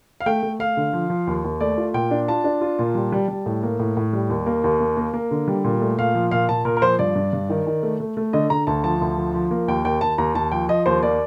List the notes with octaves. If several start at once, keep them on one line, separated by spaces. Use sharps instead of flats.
F5
A3 G5
A3
A3 F5
D3
F3
F3
D#2
D#2
A3 D5
F4
A#2 G5
D4
F4 A5
D4
F4
A#2
G3
G3
G3
A2
A#3
A2
A2
G3
D#2
A#3
D#2
A#3
A#3
A#3
D3
G3
A#2
A3
A#2 F5
F3
A#2 F5
A#2 A5
A#2 A#4
A#4
F3 C5
G2 D5
G2
G2
D#3
D#3
A3
A3
A3
D3 D#5
D3 A#5
D2 A5
F3 A5
D2
F3
F3
A#3
D#2 G5
D#2 G5
D#2 A5
D#2 A#5
D#2 A5
F3 G5
F3 D#5
D#2 C5
A#3 D5